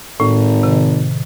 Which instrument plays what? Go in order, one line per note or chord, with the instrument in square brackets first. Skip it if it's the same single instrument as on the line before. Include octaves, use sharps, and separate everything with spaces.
[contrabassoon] G#1 [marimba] A2
[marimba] C3 D#3